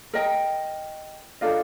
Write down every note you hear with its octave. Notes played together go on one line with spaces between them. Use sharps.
A#4 D#5 G5
D4 F4 A4 D#5